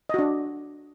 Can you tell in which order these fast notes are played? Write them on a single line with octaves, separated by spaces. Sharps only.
D#5 F#4 D4